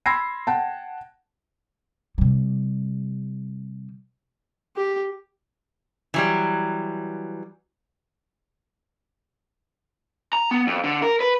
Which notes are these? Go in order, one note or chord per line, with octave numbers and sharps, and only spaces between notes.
B5 C6 E6 G#6 A#6 C7
F#5 G5 A5
C3 G3
G4
E3 F#3 G3
A#5
B3
F2
D3
A#4
B4